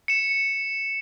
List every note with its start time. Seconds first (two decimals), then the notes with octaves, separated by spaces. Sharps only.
0.08 C#7 E7